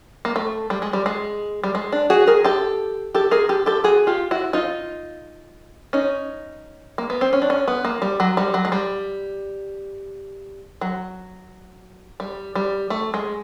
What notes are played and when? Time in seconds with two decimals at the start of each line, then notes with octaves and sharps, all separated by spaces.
0.25 A#3
0.36 A3
0.70 G3
0.82 G#3
0.93 G3
1.06 G#3
1.64 G3
1.75 G#3
1.92 D4
2.10 F#4 G#4
2.27 G#4 A#4
2.44 G4 A4
3.15 G4 A4
3.31 G#4 A#4
3.49 G4 A4
3.66 G4 A4
3.84 F#4 G#4
4.07 F4 G4
4.31 E4 F#4
4.53 D#4 F4
5.93 C#4 D#4
6.98 A#3
7.10 B3
7.21 C4
7.33 C#4
7.42 D4
7.50 C#4
7.68 B3
7.85 A#3
8.02 G3
8.20 F#3
8.37 G3
8.54 F#3
8.65 G#3
8.72 G3
10.81 F#3
12.20 G3
12.55 G3
12.90 A3
13.14 G#3